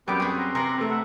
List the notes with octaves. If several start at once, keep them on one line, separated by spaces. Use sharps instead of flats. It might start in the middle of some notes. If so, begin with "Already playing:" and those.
F#2 G3 B3 C4 G4 B4 G5 D6
B3 F#4 G#4
A#5 C6
C3 A#4 B4
C3 A3
E5 F#5